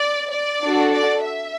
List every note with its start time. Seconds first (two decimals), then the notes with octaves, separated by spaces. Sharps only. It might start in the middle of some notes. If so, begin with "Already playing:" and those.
Already playing: D5
0.32 D5
0.62 D4 F#4 A4
0.93 D5
1.23 E5